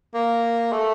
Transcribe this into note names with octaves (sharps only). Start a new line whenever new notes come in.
A#3
A3